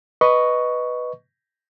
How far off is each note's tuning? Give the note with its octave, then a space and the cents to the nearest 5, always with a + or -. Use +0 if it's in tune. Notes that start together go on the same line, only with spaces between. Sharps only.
B4 +0 D#5 +0 C#6 +5